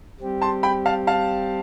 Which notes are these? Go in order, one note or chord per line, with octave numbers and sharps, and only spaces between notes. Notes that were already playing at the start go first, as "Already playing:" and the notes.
G3 C4 G4
A5 C6
G5 B5
F5 A5
F5 A5